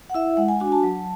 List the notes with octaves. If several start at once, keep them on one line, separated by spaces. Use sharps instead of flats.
F#5
E4 E5
G#3 F#5
G#5
D4 F#4 G#5
A5
F#3